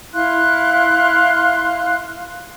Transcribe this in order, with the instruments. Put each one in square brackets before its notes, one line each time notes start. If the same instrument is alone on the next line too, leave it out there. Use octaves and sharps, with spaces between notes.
[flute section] E4 F5 C6 F#6